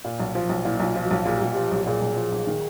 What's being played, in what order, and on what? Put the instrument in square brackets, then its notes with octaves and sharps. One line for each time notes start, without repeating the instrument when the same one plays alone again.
[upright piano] A#2
B1
F3
B1
[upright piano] A#2 [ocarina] E4
[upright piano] B1 [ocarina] E4
[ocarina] F4
[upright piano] F3
[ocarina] F#4
[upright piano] B1
[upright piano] A#2 [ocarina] G#4
[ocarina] G4
[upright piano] B1 [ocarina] F#4
[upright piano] F3 [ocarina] G4
[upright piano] B1
[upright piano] A#2 [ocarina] G#4
[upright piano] B1
F3
B1
D#3